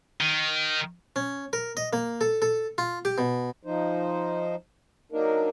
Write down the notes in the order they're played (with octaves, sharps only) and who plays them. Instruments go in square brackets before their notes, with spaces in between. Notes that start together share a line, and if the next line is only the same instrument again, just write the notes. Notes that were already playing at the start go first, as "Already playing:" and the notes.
[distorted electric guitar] D#3
[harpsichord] C#4
A#4
D#5
A#3
A4
A4
F4
G4
B2
[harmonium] F3 D#4 C5
F#3 A#3 D4 D#4 A#4